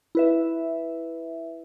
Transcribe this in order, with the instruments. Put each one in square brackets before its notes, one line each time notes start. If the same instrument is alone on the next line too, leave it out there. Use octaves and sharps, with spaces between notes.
[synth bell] E4 B4 E5